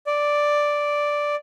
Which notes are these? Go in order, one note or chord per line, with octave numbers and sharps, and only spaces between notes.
D5